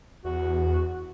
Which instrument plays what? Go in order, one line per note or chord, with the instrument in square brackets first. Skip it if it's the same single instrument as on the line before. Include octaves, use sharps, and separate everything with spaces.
[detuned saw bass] E2 [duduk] F#4